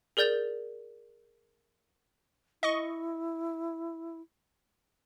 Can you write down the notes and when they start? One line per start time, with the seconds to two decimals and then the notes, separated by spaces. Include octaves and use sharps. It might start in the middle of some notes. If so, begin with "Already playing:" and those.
0.17 G#4 A#4 D5 G6 A6 F7
2.63 E4 D#5 C#6